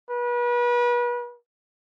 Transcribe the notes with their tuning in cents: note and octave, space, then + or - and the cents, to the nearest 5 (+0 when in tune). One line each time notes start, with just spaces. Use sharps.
B4 -35